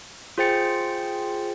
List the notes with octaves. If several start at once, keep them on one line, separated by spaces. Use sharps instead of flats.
F4 G#4 C5 G5 A6 C#7